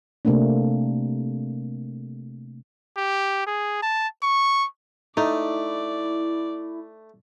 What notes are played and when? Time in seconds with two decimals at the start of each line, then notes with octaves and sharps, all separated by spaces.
0.25 C3 A3 A#3 C4 D4
2.97 G4
3.47 G#4
3.83 A5
4.23 C#6
5.17 A3 D#4 E4 D5